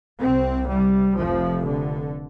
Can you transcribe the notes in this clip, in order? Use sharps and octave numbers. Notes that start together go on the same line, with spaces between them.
C2 C3 C4
G3
F1 F2 C3 F3
D3